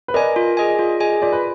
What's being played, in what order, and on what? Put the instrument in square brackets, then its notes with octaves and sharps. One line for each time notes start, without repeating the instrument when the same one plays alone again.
[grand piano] B4
[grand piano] A#4 D5 [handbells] D#5 G#5
[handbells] F4
G#4 D#5 G#5
F4
G#4 D#5 G#5
[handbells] F4 [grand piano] D5
[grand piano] B4